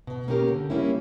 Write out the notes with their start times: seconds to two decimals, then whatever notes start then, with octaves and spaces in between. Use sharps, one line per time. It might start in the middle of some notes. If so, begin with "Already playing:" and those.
0.07 B2
0.28 A#3 C#4 G4 A#4
0.48 D3
0.70 G3 A#3 C#4 E4